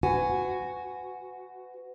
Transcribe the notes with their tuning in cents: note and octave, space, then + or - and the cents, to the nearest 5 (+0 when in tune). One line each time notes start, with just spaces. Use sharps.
F#4 +0 B4 +35 G#5 +0